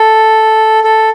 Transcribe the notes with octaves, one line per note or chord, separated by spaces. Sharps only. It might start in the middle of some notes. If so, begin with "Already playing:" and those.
Already playing: A4
A4